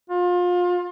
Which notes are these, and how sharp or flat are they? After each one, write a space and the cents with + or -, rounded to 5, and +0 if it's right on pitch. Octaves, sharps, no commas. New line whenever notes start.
F4 +30